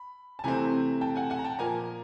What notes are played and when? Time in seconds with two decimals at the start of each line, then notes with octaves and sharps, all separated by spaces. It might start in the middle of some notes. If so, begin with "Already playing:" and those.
Already playing: B5
0.39 A5
0.44 C3 E3 A3 C4 G#5 A#5
1.01 G5 A5
1.16 F#5 G#5
1.30 F#5 G#5
1.39 A#5
1.44 G5 A5
1.59 A#2 F3 A#3 G#5 A#5